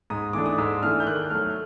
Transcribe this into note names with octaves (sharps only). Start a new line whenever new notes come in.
G#2 D#6
E3 A3 D4 D6
D#6
G#2 E6
E3 A3 D4 F6
G6
D#3 F#6
F#3 A3 F6